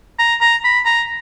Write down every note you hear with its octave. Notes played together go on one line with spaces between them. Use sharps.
A#5
A#5
B5
A#5